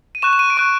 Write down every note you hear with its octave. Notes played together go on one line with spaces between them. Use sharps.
D#7
C#6 F#6 E7
E7
D#7
D7
C#6 F#6 D#7